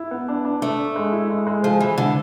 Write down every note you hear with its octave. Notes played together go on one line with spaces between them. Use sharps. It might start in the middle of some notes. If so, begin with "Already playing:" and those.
Already playing: E4
B3
D4
D4
A3 D4
D4
G#3
E4
G#3
G#3
F3 G#4
E3 G#3
D3 E4